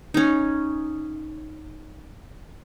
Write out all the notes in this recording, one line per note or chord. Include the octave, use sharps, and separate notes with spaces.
C#4 D#4